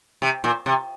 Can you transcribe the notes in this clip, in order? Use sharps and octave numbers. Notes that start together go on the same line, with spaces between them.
C3
A#2
C3